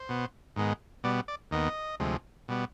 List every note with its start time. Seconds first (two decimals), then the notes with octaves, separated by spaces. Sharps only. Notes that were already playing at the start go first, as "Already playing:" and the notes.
Already playing: C5
0.09 B2 B3
0.56 G#2 D#3 G#3 B3
1.04 B2 G3 B3 D5
1.28 D5
1.51 D#2 D#3 B3 D#5
2.00 D2 C3 F3 G#3
2.48 B2 G3 B3